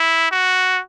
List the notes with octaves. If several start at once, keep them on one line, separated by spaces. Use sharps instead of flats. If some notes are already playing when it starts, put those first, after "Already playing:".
Already playing: E4
F#4